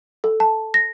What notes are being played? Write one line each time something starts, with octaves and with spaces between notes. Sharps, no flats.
A4
A5
A#6